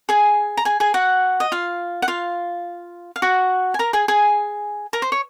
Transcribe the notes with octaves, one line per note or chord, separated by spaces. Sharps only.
G#4 G#5
A#5
G#4 G#5
G#4 G#5
F#4 F#5
D#5
F4 F5
F#5
F4 F5
F5
F#4 F#5
G#5
A#4 A#5
G#4 G#5
G#4 G#5
A#4 A#5
C5
C#5